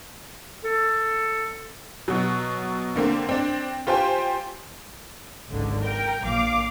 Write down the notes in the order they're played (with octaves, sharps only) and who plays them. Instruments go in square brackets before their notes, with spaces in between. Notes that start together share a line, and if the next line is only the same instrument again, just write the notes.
[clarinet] A4
[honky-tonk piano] B2 F#3
D3 A#3 C4
C4 D4
F4 G4 C5 G5 G#5
[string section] G#1 C#2 G#2 D3
A#4 G5
A#1 A#2 F5 D6